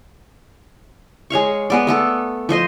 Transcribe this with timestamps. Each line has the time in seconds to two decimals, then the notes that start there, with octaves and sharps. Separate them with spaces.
1.30 G#3 C#5 F5 C#6
1.70 G#3 B3 D5
1.87 A3 B3 A4
2.49 F3 C5 D#5 C6